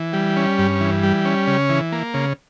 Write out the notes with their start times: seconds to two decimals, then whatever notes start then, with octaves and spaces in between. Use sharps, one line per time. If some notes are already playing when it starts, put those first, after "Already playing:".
Already playing: E3
0.13 G3
0.37 C#4
0.59 G2
0.81 E3
1.03 G3
1.25 C#4
1.47 C#3
1.69 E3
1.92 A#3
2.14 C#3